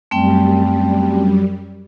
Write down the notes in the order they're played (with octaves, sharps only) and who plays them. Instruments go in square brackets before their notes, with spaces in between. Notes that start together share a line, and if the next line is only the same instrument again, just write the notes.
[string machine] F#2 G3 [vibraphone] A3 C4 G5